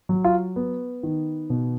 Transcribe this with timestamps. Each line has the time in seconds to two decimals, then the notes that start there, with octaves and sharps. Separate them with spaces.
0.09 F#3
0.24 F4
0.56 B3
1.03 D#3
1.50 B2